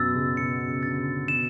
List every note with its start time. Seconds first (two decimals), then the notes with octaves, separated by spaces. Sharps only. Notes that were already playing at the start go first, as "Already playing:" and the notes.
Already playing: F#2 B2 E6 A6
0.15 C#3
0.37 B2 C#7
0.67 C#3
0.83 D3 A6
0.98 C#3
1.28 B2 E7